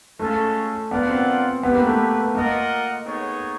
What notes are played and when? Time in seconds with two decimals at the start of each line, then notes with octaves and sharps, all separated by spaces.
0.19 G#3 A3 C#4 F4 A4
0.91 B3 D4 F4 A#4 D5 F#5
1.09 C4
1.63 B3 E4 G4 B4
1.75 A#3
1.86 A3
2.35 A#3 F4 A#4 D#5 F#5
3.06 B3 D#4 G#4 C#5